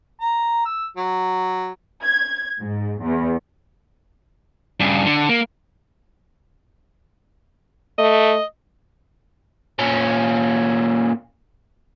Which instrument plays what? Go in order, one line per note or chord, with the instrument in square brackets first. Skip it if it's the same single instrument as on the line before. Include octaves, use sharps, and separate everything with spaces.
[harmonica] A#5
E6
F#3
[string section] G#6
G#2
E2
[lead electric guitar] G2 C#3
D3
A#3
[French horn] A3 [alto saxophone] D#5
[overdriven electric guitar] A#2 C#4